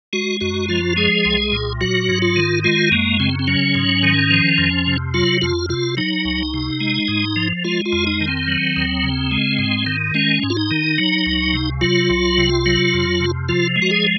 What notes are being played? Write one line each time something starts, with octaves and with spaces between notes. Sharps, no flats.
G#3 F#4
F#2 F#4
F3 F4
G#3 G#4
C2
A#2
F#3 F#4
G#2
F4
D#3
G#3 F4
F#2 A#3
C#3 C4
C4
F#3 C#4
G#2
D#3
F3
F2
C3
F#3 F4
F2 F4
C3 F4
F#3 D#4
C#2
C3
G#3
G#2
F3
G#3 F4
F4
F2
D#4
D#3
C4
F#3
D#2
C#3
G#3
G#2
D#3
G#3 C#4
G#2
F4
D#4
D#3
F#3
C#2
C3
F#3 F4
C2
C3
F#3
F2
C3
F3 F4
G#3
F#4
G#4